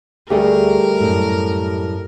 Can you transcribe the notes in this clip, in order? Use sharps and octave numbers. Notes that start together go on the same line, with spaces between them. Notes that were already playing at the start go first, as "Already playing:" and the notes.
D2 G3 A3 G4 G#4 A#4
F#2 A2